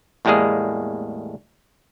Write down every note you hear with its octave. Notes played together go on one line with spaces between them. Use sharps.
E2 A2 G3 G#3 A#3 G#4